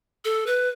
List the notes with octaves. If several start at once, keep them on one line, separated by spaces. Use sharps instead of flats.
A4
B4